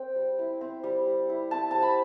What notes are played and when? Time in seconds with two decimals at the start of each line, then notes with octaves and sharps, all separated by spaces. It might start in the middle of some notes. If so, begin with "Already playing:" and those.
Already playing: C4 G5
0.16 G3
0.39 E4
0.61 C4
0.84 G3
1.06 G3
1.29 E4
1.51 C4 A5
1.71 G3 A5
1.82 B5